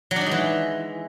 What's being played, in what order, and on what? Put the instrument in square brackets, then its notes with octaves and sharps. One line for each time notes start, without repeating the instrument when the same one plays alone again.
[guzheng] F#3
D4
D#4
G#3
E3